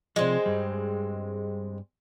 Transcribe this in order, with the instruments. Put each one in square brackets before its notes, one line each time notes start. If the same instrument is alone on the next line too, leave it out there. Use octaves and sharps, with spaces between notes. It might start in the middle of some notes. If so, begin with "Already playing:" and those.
[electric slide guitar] C3 F3 [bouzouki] G#3 C4
[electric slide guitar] G2 G3